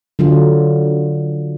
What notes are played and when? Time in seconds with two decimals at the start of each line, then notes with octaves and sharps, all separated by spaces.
0.19 D3 F#3 F4